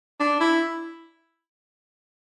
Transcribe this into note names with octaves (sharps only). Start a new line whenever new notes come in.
D4
E4